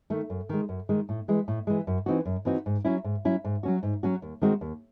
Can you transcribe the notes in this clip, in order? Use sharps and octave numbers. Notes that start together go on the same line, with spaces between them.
D#3 A3
F#2
D#3 G#3
F#2
D#3 G#3
A2
E3 G#3
A2
E3 G#3
F#2
E3 C4 D#4 F#4
F#2
E3 C4 D#4 F#4
G#2
F#3 C#4 E4
G#2
F#3 C#4 E4
G#2
F#3 C#4 F#4
G#2
F#3 C#4 F#4
D#2
D#3 G#3 C4 F#4
D#2